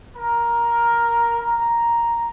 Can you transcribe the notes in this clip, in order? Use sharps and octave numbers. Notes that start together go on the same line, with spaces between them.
A#4
A#5